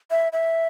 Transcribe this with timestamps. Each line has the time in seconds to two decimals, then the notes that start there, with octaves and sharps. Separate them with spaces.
0.11 E5
0.33 E5